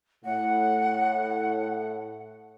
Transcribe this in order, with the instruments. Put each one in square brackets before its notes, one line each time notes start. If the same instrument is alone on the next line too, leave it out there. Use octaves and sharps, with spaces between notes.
[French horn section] A2 [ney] F#5